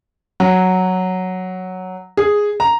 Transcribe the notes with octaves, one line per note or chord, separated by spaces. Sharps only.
F#3
G#4
A#5